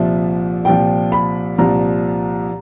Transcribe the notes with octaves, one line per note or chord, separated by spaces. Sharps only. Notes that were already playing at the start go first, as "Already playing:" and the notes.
Already playing: C2 A#2 F3 E5
C2 A#2 F3 G5
B5
C2 A#2 F3 A#5